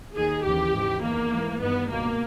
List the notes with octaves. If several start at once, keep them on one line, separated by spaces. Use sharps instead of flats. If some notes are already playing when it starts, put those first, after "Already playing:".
D#2 D#3 G#4
D#2 C#3 E3 G4
G#2 E3
E2 D#3 A#3
G#2 E3
G2 D#3 B3
C#2 B2 A#3